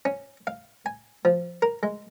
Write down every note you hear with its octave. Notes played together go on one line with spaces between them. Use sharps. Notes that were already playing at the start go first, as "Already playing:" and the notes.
C#4
F5
G#5
F3
A#4
G#3